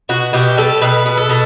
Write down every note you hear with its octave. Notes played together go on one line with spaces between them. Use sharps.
B2 F#4
B2 G4
G3 A4
B2 B4
B2
A4
B2